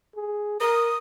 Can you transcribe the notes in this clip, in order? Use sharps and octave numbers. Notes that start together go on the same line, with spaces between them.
G#4
A#4 D#6